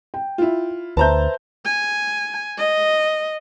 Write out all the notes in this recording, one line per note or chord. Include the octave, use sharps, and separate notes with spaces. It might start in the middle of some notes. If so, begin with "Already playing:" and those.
G5
E4 F4
D2 B4 C5 E5 A5 A#5 G6
G#5
D#5